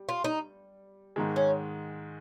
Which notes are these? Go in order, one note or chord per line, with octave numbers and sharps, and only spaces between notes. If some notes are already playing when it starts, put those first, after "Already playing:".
Already playing: G3
F4
D#4
G#2 D#3 G#3
C#4